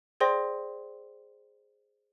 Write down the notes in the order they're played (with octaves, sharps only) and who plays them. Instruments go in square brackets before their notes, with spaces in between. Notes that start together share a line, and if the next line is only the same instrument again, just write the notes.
[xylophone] G#4 C5 D5 G5 C6 A#6